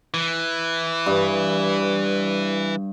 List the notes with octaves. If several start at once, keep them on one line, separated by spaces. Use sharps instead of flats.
E3
G2